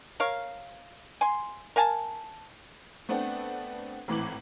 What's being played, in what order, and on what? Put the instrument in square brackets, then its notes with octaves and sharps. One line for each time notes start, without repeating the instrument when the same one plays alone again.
[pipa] A#4 C#5 F5
G#5 C6
A#4 F5 G#5 A5
[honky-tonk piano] A3 B3 C4 D4
G#1 A2 E3 D6 F#7